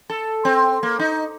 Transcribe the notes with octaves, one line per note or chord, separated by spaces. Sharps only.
A4
C4
A#3
D#4